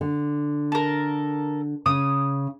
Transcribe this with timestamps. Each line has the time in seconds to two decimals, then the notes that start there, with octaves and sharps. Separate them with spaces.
0.01 D3
0.72 A4 A#4
1.86 C#3 D#6